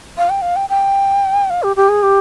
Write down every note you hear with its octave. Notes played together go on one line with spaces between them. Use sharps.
F5
G5
F5
G5
G5
F5
G4
G4
G#4
G4